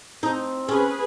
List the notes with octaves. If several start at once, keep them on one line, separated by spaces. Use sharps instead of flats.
C4 D#4
C#4 G#4 B4